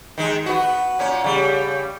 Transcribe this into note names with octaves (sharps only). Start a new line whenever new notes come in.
D#3 G#3
B3 F#4
A#2 C#4
C#3 G3